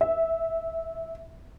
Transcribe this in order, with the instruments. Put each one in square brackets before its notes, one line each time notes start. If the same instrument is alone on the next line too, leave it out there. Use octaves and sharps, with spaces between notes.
[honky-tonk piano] E5